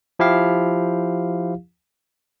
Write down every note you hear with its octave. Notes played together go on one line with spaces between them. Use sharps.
F3 E4 G4 F5